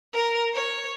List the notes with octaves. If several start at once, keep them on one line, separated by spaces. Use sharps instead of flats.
A#4
C#5